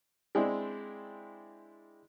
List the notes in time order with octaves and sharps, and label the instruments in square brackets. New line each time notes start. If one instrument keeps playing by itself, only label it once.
[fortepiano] G#3 C4 D4 E4